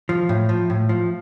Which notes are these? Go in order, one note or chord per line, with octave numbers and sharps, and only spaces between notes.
F3
A2
F3
A2
F3